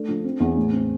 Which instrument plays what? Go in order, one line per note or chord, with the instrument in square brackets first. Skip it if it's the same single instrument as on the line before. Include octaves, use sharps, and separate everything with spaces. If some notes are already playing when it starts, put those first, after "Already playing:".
Already playing: [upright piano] A3 D4
F3
C4
E2
A2
C4